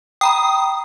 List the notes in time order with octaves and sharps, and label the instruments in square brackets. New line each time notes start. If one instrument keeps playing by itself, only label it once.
[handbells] G5 A#5 B5 [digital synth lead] D#6